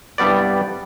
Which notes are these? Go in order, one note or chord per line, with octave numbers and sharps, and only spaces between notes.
C2 G2 G3 B3 D5